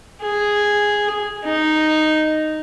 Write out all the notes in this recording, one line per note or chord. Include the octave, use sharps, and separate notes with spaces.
G#4
D#4